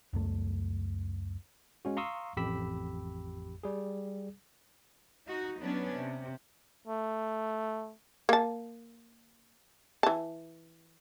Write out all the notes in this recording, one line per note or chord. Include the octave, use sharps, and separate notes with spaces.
C#2 F#2 A3
G#3 C#4 F#4
F5 A#5 C6 C#6 D#6 E6
A1 F2 G4 B5 E6 B6
G3 G#4
D#4 F#4
F#3 B3 C#4 D4
C3
A3
A#3 A5
E3 A5